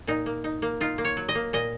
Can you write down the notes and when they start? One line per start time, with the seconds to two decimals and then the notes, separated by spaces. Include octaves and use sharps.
0.07 A#2 D#4
0.26 A#3
0.44 D#4
0.62 A#3
0.81 D#4 F4
0.98 A#3
1.05 C#5
1.17 F#3
1.29 D#5
1.35 A#3
1.53 A#2 D#5